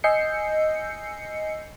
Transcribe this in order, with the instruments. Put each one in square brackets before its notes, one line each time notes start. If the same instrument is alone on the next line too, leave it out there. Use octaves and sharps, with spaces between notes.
[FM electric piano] D#5 G#5 E6 G6 C7 C#7